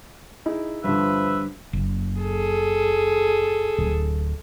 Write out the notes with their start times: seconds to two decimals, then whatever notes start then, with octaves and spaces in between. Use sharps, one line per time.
0.46 D#4 E4 G#4
0.84 G2 D3 F3 B4 E5
1.73 F#1
2.21 G#4 A4
3.78 D1